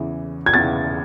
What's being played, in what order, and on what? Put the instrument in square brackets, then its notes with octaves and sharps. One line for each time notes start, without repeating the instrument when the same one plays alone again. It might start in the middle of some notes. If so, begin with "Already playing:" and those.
Already playing: [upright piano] E2 C#3 E3
[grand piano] G#6
[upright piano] E2 C#3 E3 [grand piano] A6